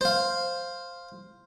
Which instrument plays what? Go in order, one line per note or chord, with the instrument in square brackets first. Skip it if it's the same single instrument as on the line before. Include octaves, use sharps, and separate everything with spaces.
[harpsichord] C5 F5